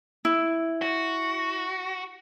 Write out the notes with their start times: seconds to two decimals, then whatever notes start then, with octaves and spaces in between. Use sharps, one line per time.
0.25 E4
0.82 F#4